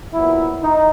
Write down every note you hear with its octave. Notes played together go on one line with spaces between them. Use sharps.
A#2 F#3 B3 E4
D#4